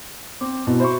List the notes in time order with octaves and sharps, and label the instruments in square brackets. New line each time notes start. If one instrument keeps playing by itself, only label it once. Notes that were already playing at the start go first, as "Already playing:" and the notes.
[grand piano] C4 [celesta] D6
[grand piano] B2 [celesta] E4 F#4
[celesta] F#4 E5 B5 [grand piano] C5 C#6